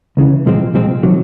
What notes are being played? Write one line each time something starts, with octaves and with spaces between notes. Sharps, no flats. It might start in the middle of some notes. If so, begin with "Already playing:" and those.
C#2 C#3 E3
C2 A#2 F3 G#3 C4
C2 A#2 F3 G#3 C4
C3 D#3 F#3